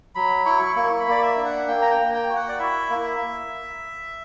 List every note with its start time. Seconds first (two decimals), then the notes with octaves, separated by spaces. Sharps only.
0.15 F#3 B5
0.46 E4 C#6
0.76 A#3 C#6
0.92 C#6
0.99 B5
1.07 A#3 D5
1.23 E5
1.37 D4
1.45 F#5
1.68 A#3 G5
1.82 A#5
1.91 G5
1.98 A#3
2.09 A#5
2.14 G5
2.29 F#4
2.36 F#5
2.49 D5
2.59 E4 E5
2.90 A#3